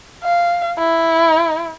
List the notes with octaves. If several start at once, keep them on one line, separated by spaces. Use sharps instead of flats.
F5
E4